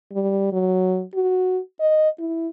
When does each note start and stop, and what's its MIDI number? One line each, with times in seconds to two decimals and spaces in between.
0.13 0.49 55
0.53 1.03 54
1.14 1.59 66
1.80 2.09 75
2.19 2.48 64